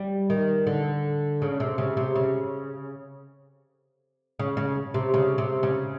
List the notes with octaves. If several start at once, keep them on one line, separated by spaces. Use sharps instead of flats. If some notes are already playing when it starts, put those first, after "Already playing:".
Already playing: G3
D#3
D3
C#3
C3
C#3
C3
C#3
C#3
C#3
C3
C#3
C3
C#3